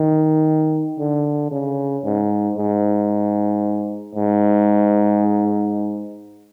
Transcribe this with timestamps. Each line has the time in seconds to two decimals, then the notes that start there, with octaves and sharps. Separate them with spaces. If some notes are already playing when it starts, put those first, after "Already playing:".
Already playing: D#3
0.99 D3
1.51 C#3
2.04 G#2
2.57 G#2
4.15 G#2